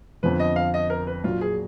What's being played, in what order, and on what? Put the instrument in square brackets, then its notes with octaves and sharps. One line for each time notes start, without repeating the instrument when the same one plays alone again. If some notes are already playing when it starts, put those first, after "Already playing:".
[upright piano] F2 D3 F3 B3 [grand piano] B4
[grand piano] D#5
F5
D#5
A#4
B4
[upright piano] A#2 F#3 A#3 D4 [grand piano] F4
[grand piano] G#4